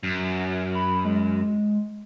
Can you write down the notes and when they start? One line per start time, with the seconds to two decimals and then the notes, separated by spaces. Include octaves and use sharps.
0.03 F#2
0.75 B5
1.05 G#3